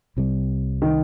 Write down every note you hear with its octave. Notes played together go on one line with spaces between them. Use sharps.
C2 C3 G3
D#3